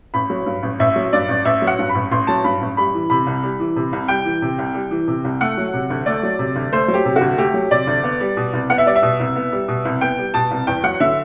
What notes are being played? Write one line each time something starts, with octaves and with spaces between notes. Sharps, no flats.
A1 B5
F#3
G2
A1
A1 E5
F#3
G2 D5
A1
A1 E5
F#3
F#5
G2
B5
A1
A1 C6
F#3 A5
G2 B5
A1
G3 B5
E3
C3 B5
C2
G3
E3
C3
C2
G3 G5
E3
C3
C2
G3
E3
C3
C2
A3 F#5
F#3
C3
D2
A3 D5
F#3
C3
D2
A3 C5
F#3
G4
C3
F#4
D2
A3 G4
F#3
C3 D5
D2
B3
G3
B2
C2
B3 F#5
E5
G3 D5
E5
B2
C2
B3
G3
B2
C2
B3 G5
G3
B2 A5
C2
E2 G5
F#3 F#5
D3 E5